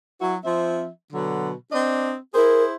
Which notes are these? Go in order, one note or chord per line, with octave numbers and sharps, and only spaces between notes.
F#3 E4 F#4
F3 C4 E5
B2 D3 F#3
C4 D4 D#5
E4 G#4 A#4 C5